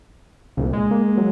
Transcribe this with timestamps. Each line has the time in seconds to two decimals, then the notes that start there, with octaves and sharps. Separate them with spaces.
0.57 C2 A#2 C#3
0.73 G#3
0.91 A#3
1.18 F#3